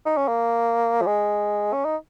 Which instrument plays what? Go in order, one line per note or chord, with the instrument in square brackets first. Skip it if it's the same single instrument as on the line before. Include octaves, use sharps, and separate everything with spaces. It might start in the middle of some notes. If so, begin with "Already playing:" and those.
[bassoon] D#4
C#4
A#3
F3
G#3
C#4
D#4